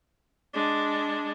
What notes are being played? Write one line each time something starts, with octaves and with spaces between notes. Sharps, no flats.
G#3 D4